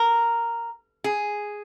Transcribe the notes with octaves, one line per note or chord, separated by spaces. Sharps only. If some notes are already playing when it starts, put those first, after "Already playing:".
Already playing: A#4
G#4